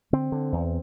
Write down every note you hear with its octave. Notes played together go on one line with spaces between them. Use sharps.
D3 C4
D3
E2